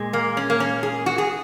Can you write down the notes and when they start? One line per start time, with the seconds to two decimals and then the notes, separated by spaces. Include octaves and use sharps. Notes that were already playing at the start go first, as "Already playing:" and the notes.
Already playing: A#2 G#3
0.13 A#3
0.37 C#4
0.50 A#3
0.60 C#4
0.83 G#4
1.06 F#4
1.18 G#4